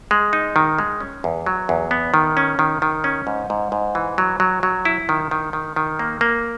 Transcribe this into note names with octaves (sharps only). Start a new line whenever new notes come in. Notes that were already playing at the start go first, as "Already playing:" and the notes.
G#3
D#4
D#3
G#3
C#4
E2
F#3
E2
B3
D#3
C#4
D#3
D#3
C#4
G#2
G#2
G#2
E3
F#3
F#3
F#3
E4
D#3
D#3
D#3
D#3
A#3
A#3